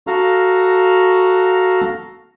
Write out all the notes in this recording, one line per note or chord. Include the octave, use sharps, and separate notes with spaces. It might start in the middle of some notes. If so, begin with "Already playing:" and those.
F#4 A4 F5 A#5